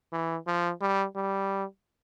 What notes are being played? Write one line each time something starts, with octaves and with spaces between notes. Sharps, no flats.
E3
F3
G3
G3